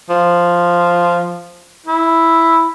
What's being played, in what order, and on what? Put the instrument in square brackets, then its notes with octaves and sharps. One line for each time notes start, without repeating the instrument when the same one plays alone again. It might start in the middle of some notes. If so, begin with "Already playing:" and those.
[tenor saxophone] F3
E4